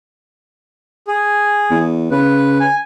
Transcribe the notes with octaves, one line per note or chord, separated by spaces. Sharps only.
G#4
E2
C#3 B4
G#5